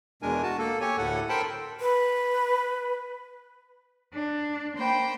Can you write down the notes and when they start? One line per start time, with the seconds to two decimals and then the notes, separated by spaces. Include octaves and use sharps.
0.22 E2 B2 G#3 D4 A#4 G#5
0.43 F#4 A5
0.59 A#3 A4
0.81 G4 C#5 G#5
0.98 D2 A2 A4 F#5
1.29 A4 A#4 C5 G5 A5 B5
1.80 B4
4.13 D4
4.75 A#3 C5 G5 B5